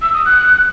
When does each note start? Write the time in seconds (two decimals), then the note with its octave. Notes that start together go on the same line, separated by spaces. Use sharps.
0.02 E6
0.14 D#6
0.26 F#6